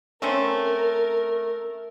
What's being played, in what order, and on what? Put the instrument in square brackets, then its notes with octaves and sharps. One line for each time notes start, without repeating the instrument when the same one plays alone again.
[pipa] A3 C4 C#4 [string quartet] A#4